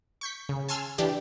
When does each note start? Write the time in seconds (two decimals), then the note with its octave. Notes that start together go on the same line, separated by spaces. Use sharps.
0.21 C#6 G6 B6
0.49 C#3
0.69 G#5 A5 C6 E6 F6 G#6
0.98 E3 D4 G4 D5